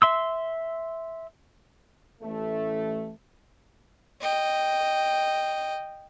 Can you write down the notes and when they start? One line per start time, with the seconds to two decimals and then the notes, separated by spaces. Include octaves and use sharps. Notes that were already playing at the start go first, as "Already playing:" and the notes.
0.02 E5 C6 E6
2.22 A1 A3
4.21 D#5 G5